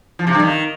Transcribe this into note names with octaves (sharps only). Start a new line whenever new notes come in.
F3
C3
G2
D#3